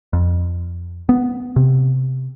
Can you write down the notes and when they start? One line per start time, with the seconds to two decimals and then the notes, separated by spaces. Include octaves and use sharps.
0.13 F2
1.09 B3
1.56 C3